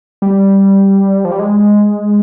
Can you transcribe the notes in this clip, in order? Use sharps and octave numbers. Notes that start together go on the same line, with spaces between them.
G3
F3
G3
G#3